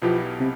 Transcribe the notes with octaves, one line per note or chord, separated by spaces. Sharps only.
B1 B2 F3 B3 E4 G4
C3